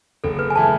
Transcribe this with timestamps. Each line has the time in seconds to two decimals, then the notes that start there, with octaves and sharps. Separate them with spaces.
0.24 F#1 A4
0.39 B4
0.50 G#5
0.55 E3 A3 A5